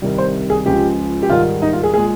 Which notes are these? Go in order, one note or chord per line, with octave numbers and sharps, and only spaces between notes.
C2 C3 D#3 G3
C5
G#4
C#2 C#3 F3 G#3 G4
G4
G#2 D#3 G3 F4
D#4
F4
G#4
A#2 G#3 G#4